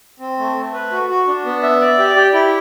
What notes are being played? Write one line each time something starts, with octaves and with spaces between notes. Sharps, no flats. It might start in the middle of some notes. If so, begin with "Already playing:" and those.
C4
A3
A3
B4
F#4
F#4
D4
B3
E5
D5
G4
G4
E4